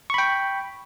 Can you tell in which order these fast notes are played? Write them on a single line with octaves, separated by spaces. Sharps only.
C#6 B5 G5